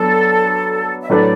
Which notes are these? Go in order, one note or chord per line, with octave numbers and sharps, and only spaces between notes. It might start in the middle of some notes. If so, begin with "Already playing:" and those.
Already playing: F#3 B3 D4 A4
E5
A2 F#3 A3 D4 B4 D5